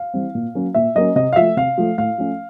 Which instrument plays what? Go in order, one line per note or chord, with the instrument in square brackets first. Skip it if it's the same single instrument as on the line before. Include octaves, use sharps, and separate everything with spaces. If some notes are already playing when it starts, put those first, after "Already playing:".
Already playing: [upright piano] F5
E3 G3 C4
A#2
F#3 A#3 C#4
A#2 E5
F#3 A#3 C#4 D#5
C3 D#5
F5
F3 A3 E5
C3 F5
F3 A3
A2 F5
F3 A3 C#4